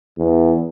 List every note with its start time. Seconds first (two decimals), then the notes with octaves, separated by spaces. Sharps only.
0.18 E2